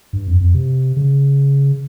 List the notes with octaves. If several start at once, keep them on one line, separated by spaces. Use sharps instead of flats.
G2
F2
F2
C3
C#3